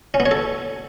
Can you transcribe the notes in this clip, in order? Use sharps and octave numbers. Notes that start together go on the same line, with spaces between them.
C#4
B3
C#5
A4